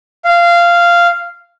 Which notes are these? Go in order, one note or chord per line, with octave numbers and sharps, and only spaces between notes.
F5